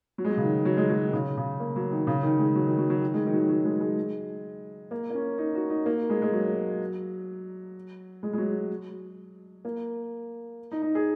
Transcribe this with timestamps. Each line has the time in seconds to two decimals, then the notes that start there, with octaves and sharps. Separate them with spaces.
0.18 F#3
0.25 G#3
0.30 F#3
0.37 C#3
0.42 D#3
0.65 F#3
0.77 G#3
0.89 F#3
1.08 D#3
1.13 C#3
1.37 C#3
1.60 A#3
1.76 F#3
1.91 D#3
2.07 C#3
2.23 D#3
2.39 G#3
2.55 F#3
2.67 D#3
2.78 F#3
2.90 F#3
3.02 D#3
3.14 G#3
3.26 D#3
3.34 F#3
3.38 D#3
3.49 F#3
3.65 G#3
3.80 G#3
4.91 A#3
5.10 A#3
5.14 C#4
5.38 D#4
5.55 F#4
5.70 D#4
5.86 A#3
6.10 G#3
6.22 G#3
6.33 F#3
8.23 G#3
8.33 G#3
8.38 F#3
9.65 A#3
10.72 D#4
10.82 D#4
10.95 G#4